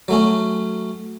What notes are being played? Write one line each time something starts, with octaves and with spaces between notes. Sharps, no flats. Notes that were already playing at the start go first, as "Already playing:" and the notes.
F#3 A3 C#4